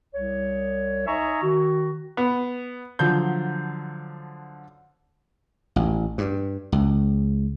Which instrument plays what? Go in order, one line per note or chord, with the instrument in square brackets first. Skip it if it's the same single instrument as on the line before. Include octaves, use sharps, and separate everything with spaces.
[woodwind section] C2 C#5
D#4 D#5 E5 G#5 A#5 C#6
D#3 F#4
[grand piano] B3
D3 F3 F#3 G6
[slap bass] A1
G2
C#2